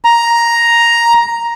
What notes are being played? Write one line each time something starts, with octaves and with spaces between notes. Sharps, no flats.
A#5